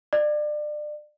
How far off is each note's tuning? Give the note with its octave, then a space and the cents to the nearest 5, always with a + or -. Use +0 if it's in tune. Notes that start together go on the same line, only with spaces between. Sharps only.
D5 +30